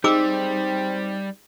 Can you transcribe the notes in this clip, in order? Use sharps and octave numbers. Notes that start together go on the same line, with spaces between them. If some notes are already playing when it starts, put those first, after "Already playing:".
G3 C4 D#4 G#4 D6 E6